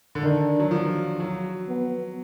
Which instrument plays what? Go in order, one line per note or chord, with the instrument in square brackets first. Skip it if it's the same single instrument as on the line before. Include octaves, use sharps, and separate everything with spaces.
[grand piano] D3
[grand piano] D#3 [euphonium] D4
[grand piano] F#3
F3
F#3
[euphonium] B3